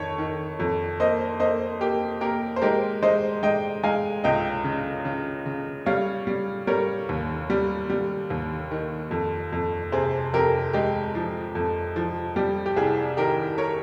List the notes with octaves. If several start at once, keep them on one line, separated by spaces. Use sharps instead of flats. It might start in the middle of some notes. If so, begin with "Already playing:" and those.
Already playing: F2 D#3 C#5
D#3
F2
A#3 C5 D#5
A#3 C5 D#5
A#3 G4
A#3 G4 A#4
C5
G#3 G4 A#4
G#3 C5 D#5
G#3 D#5 G5
G#3 F5 G#5
C#2 D#5 G5
C#3
C#3
C#3
G3 C#5 F5
G3
G3 A#4 C#5
D#2
G3
G3
D#2
D#3
F2
F2
C3 G#4 C5
F2 G4 A#4
G#3 G4
F3
F2
F3
G3 G4
G4
C2 G#4
D#3 G4 A#4
A#4 C#5